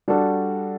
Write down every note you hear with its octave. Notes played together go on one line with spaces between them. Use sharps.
G3 D4 F#4 A4